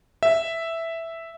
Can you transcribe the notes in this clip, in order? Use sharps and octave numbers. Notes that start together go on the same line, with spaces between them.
E5